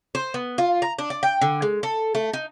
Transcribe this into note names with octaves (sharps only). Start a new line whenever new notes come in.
C5
B3
F4
A#5
D4
D5
G5
D3
G#3
A4
A3
D#4